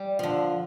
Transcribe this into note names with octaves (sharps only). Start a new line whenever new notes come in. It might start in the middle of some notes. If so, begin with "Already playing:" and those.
Already playing: G3
D3 F3